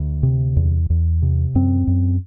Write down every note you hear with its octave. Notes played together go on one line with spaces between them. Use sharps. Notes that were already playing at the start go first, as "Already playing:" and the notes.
Already playing: D2
C3
E2
E2
C3
F#2 C4
F#2